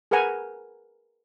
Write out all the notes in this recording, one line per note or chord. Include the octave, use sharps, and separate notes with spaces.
G#4 A#4 B4 F#5 G#5 A#5